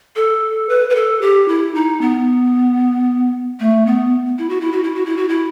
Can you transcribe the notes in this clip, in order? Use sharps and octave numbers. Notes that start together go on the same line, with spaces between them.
A4
B4
B4
A4
G4
E4
D#4
B3
A3
B3
E4
F#4
E4
F#4
E4
F#4
E4
F#4
E4